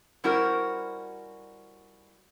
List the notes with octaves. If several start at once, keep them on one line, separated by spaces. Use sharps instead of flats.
G3 C#4 E4 F#4 A#4 C5